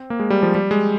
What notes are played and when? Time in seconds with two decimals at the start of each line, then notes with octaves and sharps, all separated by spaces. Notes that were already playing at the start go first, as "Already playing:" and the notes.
Already playing: C4
0.10 A#3
0.20 G#3
0.30 G3
0.43 F3
0.55 G3
0.71 G#3